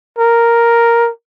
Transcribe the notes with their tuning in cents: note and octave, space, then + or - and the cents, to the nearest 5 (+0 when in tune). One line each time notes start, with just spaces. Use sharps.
A#4 +0